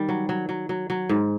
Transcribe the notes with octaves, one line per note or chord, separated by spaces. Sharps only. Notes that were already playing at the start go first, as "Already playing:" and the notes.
Already playing: D#3 G3
F#3
F#3
F#3
F#3
F#3
G#2